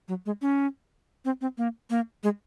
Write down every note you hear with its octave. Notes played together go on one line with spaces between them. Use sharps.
F#3
G#3
C#4
C4
C4
A#3
A#3
G#3